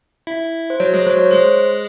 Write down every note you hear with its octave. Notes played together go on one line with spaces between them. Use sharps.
E4
C5
F#3 C#5
G#3
F#3 C5
C#5
G#3 C5